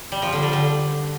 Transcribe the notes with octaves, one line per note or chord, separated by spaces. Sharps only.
G3
F3
D3
G3
D3